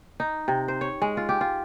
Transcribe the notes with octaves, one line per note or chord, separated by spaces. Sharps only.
D#4
C3
C5
C#5
G#3
F4
G4
F4